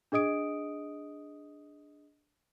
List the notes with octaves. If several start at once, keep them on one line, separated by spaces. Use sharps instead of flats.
D4 G#4 D#5 D#6 D7